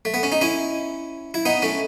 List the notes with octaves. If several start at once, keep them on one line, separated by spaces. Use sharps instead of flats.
A3
B3
C#4
D#4
C#4 E4
E4
B3 D#4
A3 C#4